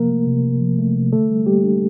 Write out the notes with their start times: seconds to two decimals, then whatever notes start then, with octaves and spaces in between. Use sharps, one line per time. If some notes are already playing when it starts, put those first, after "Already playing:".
Already playing: C3 F3 A#3 A#4
0.10 A3
0.27 C3
0.45 C3
0.61 F3
0.79 A3
0.96 C3
1.12 D3 A3 A4
1.30 G3
1.46 G3 A#3 G4
1.64 D4